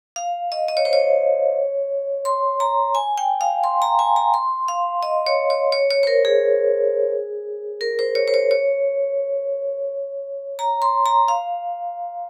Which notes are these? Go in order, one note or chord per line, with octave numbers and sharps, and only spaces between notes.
F5
D#5
D#5
C#5
C5
C#5
C6
A#5
G#5
G5
F5
C6
A#5
G#5
A#5
C6
F5
D#5
C#5
C#5
C#5
C#5
C5
A#4
G#4
A#4
C5
C#5
C5
C#5
C#5
A#5
C6
A#5
F5